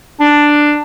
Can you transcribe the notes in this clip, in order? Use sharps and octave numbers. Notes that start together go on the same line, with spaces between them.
D4